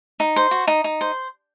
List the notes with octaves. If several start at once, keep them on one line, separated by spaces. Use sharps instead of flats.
D#4
C5
F#4
D#4
D#4
C5